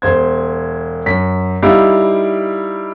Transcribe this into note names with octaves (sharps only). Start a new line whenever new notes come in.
E1 C5 G#6
F#2 B6
G3 D#4 E4 G4 F5